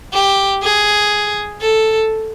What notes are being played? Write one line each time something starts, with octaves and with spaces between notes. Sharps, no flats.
G4
G#4
A4